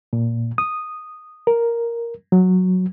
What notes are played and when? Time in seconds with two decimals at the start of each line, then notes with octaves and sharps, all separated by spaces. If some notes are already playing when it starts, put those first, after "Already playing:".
0.13 A#2
0.58 D#6
1.47 A#4
2.32 F#3